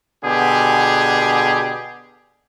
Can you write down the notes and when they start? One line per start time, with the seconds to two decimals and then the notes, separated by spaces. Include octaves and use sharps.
0.23 B2 D3 G4 G#4